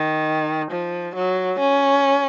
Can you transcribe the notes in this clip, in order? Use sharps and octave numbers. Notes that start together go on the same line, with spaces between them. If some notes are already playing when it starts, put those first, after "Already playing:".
Already playing: D#3
F3
F#3
C#4